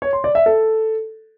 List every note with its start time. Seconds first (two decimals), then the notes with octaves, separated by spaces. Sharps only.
0.02 C#5
0.13 C6
0.24 D5
0.35 E5
0.46 A4